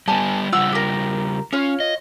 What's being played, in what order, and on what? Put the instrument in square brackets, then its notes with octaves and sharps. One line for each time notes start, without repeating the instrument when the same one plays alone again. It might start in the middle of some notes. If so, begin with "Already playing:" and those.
[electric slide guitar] G3 B3 [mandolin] D5 G#5 A5
[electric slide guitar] C#3 G3 F4 [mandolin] F#5 E6
[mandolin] G4 A#4
[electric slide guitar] C#4 [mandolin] F4 C#5
[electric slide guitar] D#5